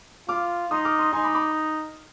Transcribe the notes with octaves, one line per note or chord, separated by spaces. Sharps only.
F4 D6 F6
D#4 C6 D#6
D6 F6
C6 D#6
D#4 G#5 C6
B5 D6
B5 D6